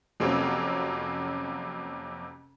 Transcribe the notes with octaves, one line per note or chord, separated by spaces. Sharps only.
F2 C3 F#3 A#3 C4 C#4